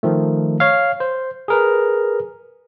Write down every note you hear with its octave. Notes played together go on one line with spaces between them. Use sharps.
D#3 F3 A3
C#5 F5
C5
G#4 A#4 B4